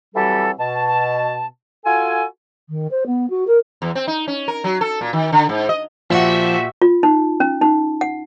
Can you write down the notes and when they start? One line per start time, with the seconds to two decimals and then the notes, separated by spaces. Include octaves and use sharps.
0.15 E3 F#3 G3 C4 G4 A4
0.59 B2 A5
1.85 F4 F#4 A4 G#5
2.69 D#3
2.91 C5
3.06 B3
3.30 F#4
3.47 A#4
3.82 E2
3.95 C4
4.08 D#4
4.28 C#4
4.48 A#4
4.64 F#3
4.81 A4
5.01 A#2
5.13 D#3
5.32 D3
5.49 G#2
5.69 D#5
6.10 A#2 F3 F#4 G4 E5 F#5
6.82 F4
7.03 D#4
7.40 C#4
7.62 D#4
8.01 F#5